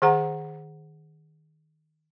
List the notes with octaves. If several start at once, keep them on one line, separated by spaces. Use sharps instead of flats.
D#3 G#4 C5 F#5 A#5